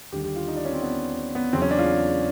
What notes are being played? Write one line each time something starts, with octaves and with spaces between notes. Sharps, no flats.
D#2 D3 G3 G4
G4
F4
D#4
D4
C#4
C4
B3
B3
E2 C#3 F#3 C4
C#4
D4
F4